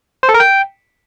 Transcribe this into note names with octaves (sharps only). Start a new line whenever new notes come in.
C5
A4
A#4
G5